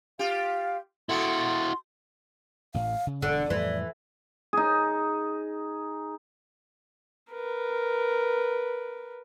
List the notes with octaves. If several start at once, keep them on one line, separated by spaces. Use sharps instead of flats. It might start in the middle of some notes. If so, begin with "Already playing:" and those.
F4 G4 F5
B2 B3 E4 F#4 A4 C6
A1 A2 F5
C#3
E1 D3 D4 D5
F2 A2 E3 G3
D#4 G#4
A#4 B4